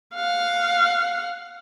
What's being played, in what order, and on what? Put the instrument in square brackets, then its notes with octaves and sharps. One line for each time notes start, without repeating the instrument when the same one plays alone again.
[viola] F5 F#5